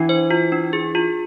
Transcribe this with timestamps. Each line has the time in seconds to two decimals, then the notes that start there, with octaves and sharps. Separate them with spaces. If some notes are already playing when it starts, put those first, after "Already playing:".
Already playing: E3 D4
0.09 C5
0.31 F4
0.52 D4
0.73 G#4
0.95 F4